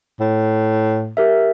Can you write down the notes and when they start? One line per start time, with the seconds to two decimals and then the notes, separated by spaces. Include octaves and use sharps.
0.20 A2
1.17 G4 A#4 E5